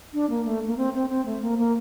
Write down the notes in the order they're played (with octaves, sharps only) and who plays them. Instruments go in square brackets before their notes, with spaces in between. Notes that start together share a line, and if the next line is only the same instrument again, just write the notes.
[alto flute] D4
A#3
A3
A#3
C4
C4
C4
A3
A#3
A#3